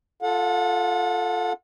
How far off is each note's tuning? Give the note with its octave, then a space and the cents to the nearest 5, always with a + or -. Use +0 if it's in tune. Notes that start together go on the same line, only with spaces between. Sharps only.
F4 +0 A4 +0 F#5 -35